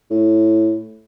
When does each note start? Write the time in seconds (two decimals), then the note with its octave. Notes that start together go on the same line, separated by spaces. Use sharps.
0.10 A2